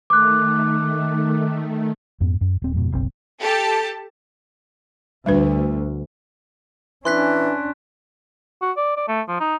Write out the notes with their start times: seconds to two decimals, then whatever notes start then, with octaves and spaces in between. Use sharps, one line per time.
0.10 D#3 A3 D6 F#6
2.20 F2 G#2 B3
2.41 F#2
2.62 D#1 C4
2.73 F2 G#2 B2
2.92 F#1 B1 B2 C4
3.39 G4 A4 A5
5.26 D2 G3 D4 B4
7.05 E3 C#4 D4 C6 F#6 B6
8.62 F#4
8.77 D5
8.97 D5
9.08 A3
9.28 F3
9.40 D#4